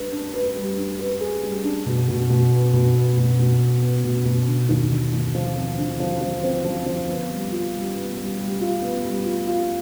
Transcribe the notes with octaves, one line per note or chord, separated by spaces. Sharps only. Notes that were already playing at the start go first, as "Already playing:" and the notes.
Already playing: G3 D4 B4
D4
B4
G3
D4
B4
G#4
G3
D4
B2
B2
B2
B3
B2
B3
B2
B2
B3
B3
B2
B2
D3
D#2
D3
D#2
F3
C4
D3
F3
F3
C4
F3
F3
B3
G3
F4
G3
B3
G3
G3
F4
B3
G3
F4
F4